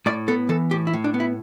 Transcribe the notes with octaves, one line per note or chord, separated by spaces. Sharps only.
A2 D5
B3 A4
E3 A4
A2 G4
E4
A2
D4
B3
E4